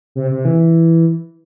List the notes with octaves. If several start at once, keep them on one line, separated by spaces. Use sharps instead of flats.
C3
C3
E3